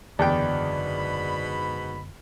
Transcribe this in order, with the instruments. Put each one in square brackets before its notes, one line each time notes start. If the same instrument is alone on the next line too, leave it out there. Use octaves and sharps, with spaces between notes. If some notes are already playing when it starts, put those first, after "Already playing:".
[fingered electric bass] F#1 D3 [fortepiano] E2 G5 [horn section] G#2 B2 B5 [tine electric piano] D5